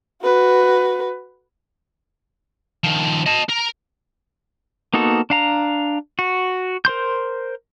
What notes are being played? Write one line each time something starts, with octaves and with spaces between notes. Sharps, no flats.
F#4 B4
D#3 F3
D#5 A5
A#4
A#3 B3 D#4 F#4 A4
D4 F5 A#5
F#4
A#4 C5 C6 G6